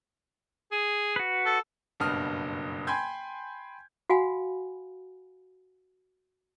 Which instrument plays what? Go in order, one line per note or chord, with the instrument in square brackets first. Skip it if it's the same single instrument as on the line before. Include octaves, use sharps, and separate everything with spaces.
[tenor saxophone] G#4
[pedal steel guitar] F#4 B4
[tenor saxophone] A4
[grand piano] F#1 G2 B2 D#6 F6
G5 G#5 B5 C6 G6 G#6
[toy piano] F#4 F5 F#5 G#5 B5